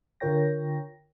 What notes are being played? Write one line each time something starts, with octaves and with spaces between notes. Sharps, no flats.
D3 F4 A#4 C#5 G5 A#6